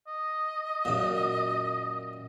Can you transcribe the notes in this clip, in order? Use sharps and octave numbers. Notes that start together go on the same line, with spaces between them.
D#5
F#2 A#2